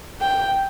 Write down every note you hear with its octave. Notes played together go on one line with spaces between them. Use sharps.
G5